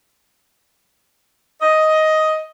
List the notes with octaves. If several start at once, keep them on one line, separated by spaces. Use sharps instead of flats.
D#5